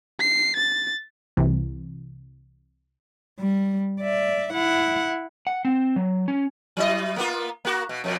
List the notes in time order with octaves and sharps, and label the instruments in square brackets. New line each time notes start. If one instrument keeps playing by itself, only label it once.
[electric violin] C7
A6
[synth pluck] C2 C3 E3
[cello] G3
D5 E5
E4 F#5
[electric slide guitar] F#5
C4
F#3
C#4
[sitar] F#3 E4 D#5
A#3 B3 F4
A#3 F#4
B2
F2 B2